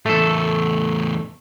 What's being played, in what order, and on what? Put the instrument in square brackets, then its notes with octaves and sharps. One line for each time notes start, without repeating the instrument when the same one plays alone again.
[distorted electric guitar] E2 A2 [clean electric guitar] A3 A4